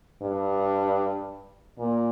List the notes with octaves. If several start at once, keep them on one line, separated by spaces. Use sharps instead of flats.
G2
A#2